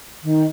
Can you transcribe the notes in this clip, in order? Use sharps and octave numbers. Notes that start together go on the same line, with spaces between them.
D#3